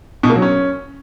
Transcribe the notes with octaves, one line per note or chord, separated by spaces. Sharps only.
B2
A#3
F#3
C#4